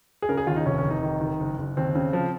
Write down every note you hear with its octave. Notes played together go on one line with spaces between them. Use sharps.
G#4
C#3 A#4
G#4
D#2 F4
D#4
F1 C#4
C#4
F1
D#4
D#3
D#3
F#1
F#1
D#2 C4
C#3
F3